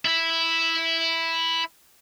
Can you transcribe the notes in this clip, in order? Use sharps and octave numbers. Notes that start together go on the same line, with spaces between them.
E4 E5